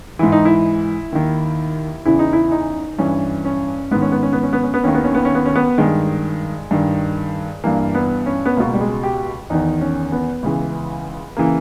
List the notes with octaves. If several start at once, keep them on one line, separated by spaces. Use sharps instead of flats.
G#2 E3 E4
D#4
E4
D#2 D#3
E2 C#3 E3 E4
D#4
E4
D#4
G2 E3 C#4
C#4
G#2 D#3 B3
C#4
B3
C#4
B3
C#4
B3
C#4
B3
D#2 D#3 C#4
B3
C#4
B3
C#4
B3
C#4
B3
G2 D#3 G#3
G2 D#3
G2 E3 A#3
B3
C#4
B3
C#2 B2 A#3
G3
G#3
G4
E2 D#3 D#4
C#4
B3
C#2 C#3 E3
C#3 E3 A#3